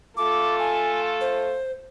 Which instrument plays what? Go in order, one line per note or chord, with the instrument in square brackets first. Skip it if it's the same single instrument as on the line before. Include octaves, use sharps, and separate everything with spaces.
[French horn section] A3 F4 A4 [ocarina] D6
[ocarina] G#5
C5